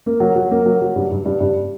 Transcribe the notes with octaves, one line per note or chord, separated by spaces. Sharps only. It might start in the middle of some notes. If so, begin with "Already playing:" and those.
A#3
F#3
F#3
A#3
F#3
F#3
G2
G2
G2
G2